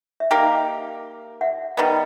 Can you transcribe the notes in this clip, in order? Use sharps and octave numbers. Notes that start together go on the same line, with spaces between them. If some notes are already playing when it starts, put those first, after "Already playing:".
E5
A#3 D#4 G4 A#4 D#5 F5
E5 F#5
D#3 G3 B3